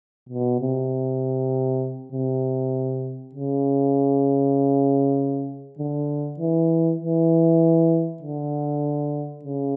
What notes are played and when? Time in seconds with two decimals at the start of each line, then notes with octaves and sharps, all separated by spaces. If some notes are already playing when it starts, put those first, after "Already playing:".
0.29 B2
0.60 C3
2.12 C3
3.34 C#3
5.79 D3
6.39 E3
7.00 E3
8.22 D3
9.45 C#3